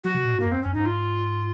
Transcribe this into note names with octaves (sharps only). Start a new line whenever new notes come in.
F#3 F#4
C3
A#2
G#2
F#2 A#3
C4
F#2 C#4
G#2 D#4
F4